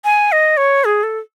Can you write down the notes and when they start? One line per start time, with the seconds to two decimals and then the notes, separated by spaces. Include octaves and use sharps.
0.04 G#5
0.32 D#5
0.57 C#5
0.85 G#4
1.03 A4